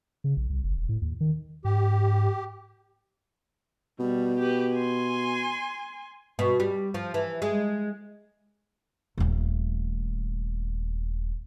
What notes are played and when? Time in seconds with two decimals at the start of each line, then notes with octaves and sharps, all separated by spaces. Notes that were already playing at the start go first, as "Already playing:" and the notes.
0.24 C#3
0.37 A#1
0.50 C2
0.63 F#1
0.77 E1
0.89 A2
1.01 D#2
1.21 D#3
1.65 G#2 G4
3.99 B2 G3
4.39 G4 B4
4.74 G#5 C6
6.39 B2
6.60 G3
6.94 F3
7.14 E3
7.42 G#3
9.18 D#1 A3